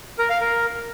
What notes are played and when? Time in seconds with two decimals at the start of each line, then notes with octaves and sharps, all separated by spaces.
0.19 A#4
0.30 F5
0.41 A#4